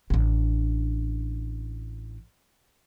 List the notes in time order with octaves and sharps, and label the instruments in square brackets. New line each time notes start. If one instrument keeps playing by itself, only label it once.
[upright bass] A1 D4